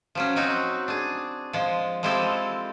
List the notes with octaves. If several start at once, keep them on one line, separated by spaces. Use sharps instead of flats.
F3 F#3 C#4
F#3 C4 D#4 F#4
D4 G#4
F3 G#3
F3 G#3 C4 E4 G4 A4